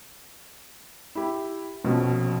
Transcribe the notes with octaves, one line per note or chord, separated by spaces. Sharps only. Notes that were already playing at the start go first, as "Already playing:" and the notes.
E4 G4
F1 A#1 B2 F3 C#4